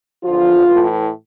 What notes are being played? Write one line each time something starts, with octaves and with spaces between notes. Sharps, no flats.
E2 D3 F3 F4
A2 E3